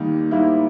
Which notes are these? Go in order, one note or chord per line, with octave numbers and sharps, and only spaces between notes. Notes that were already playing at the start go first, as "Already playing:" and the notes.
Already playing: D#2 D#3 G3 A#3 D#4
G#2 G3 A#3 E4